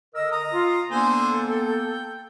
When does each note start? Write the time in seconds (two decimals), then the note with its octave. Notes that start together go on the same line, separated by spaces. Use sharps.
0.15 D3 A#4 D#5 E6
0.32 A#5 D#6
0.53 F4
0.90 D3 A#3 B3 A4 C5 G#5
1.50 G5